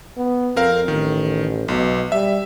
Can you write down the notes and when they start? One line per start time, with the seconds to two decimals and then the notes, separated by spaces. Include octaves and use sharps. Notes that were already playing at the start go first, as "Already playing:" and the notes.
0.18 B3
0.56 F2 C4 A#4 F5
0.88 A1 D#3
1.68 B1 B2
2.12 G3 E5